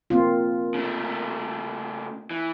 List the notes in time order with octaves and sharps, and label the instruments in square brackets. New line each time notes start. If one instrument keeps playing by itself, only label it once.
[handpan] A#3 C4 F4
[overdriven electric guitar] C#3 A3
E3